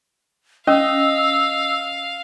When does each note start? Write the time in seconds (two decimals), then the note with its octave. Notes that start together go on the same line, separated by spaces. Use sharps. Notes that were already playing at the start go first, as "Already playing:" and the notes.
0.67 C#4 D#5 F5 E6